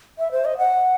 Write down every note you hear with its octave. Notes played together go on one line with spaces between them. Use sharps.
E5
C5
D#5
F#5